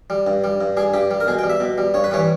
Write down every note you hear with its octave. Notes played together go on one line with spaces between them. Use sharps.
G3
G2
G3
G2
G3 G#4
G2 G4
G3
A#4
B2 G#4
G5
G3
E5
B2
G3
G2 C#5
B4
E3 G3 C#5